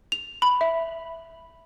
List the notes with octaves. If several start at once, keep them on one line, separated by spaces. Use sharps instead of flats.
F7
B5
E5